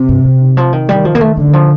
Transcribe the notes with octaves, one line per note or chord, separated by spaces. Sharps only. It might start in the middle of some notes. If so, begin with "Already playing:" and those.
Already playing: C3
G2
A2
D#3
F3
D#3
D#3 G3
F3
A#3
A3
D3 A3
D#3
F3